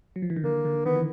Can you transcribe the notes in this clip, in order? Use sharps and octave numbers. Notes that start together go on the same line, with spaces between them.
F#3
F3
E3
D#3
D3 A#3
D3
D#3 B3
E3